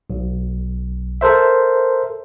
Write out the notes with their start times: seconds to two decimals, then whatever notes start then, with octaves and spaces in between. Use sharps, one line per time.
0.10 B1
1.21 A4 A#4 C5 E5